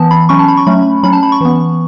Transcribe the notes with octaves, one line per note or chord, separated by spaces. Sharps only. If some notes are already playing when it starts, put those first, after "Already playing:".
Already playing: E3 B3 A5
B5
F#3 C#4 C#6
A5
B5
C#6
F#3 A3 C#4 B5
F#3 C#4 B5
A5
B5
C#6
E3 B3